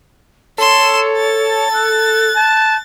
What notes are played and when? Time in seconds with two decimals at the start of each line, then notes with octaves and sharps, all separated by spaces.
0.58 A4 C#5 C6 E7
1.17 A6
1.74 F#6
2.37 A5